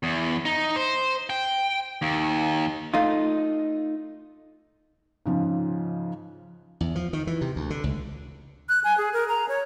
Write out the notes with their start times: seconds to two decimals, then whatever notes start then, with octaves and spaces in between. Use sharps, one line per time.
0.03 E2
0.45 D#4
0.76 C5
1.30 G5
2.02 D#2
2.94 A3 D#4 F4
5.26 G#2 C#3 F3
6.81 E2
6.95 F3
7.13 D#3
7.27 E3
7.41 C3
7.56 D2
7.70 D3
7.84 C#2
8.69 F#6
8.84 G#5
8.98 G#4
9.13 A#4
9.28 A#5
9.49 C#5